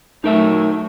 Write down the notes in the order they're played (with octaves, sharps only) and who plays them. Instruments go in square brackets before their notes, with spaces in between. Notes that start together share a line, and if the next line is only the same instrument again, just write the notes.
[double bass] F#3 A3 [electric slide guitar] D#4 A#4 E5